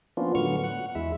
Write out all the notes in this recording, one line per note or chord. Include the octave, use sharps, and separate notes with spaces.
F3 A#3 B3 C#4 D4 F4
A2 D3 F#3 B3 C#6 F6
F#5
E2 G#3 E4 E5